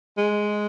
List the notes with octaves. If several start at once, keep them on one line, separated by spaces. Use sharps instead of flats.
G#3